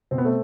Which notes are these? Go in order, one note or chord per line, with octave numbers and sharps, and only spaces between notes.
B2 C4
B3
A3 C4